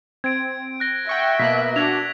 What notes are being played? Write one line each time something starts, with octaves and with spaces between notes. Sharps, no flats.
C4 G#6 D7
F#6 A#6 G7
E5 F#5 G5 C#6
B2 A#3 F#6 B6
D4 F#4 E6 G#6 F7